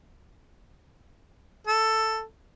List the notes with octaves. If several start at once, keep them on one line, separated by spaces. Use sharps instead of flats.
A4